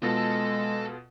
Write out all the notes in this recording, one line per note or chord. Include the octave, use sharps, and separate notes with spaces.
B2 G#3 B3 F4 A4 A5 A#6